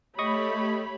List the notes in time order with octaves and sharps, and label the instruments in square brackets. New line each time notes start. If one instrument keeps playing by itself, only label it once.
[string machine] A3 [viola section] G4 C#5 B5 [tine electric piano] D#5 C#6 D#6